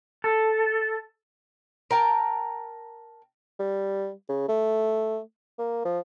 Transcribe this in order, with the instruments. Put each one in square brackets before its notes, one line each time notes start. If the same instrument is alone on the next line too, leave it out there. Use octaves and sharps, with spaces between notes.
[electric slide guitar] A4
[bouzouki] A#4 G5 A5 A#5
[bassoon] G3
C#3
A3
A#3
F3